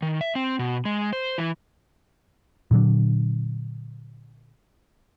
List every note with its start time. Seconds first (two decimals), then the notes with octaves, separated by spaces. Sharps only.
0.02 D#3
0.21 E5
0.35 C4
0.59 B2
0.85 G#3
1.13 C5
1.38 E3
2.71 A#2 D3 F#3 D4